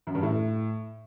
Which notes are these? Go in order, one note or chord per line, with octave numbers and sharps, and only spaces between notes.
F#2
G2
A2